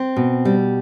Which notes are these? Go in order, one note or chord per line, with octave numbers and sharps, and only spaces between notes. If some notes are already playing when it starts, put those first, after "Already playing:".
Already playing: C4
B2
G3